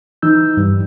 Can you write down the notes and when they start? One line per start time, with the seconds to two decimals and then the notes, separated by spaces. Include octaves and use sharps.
0.22 E3 D#4 E6 G6
0.57 G2 G3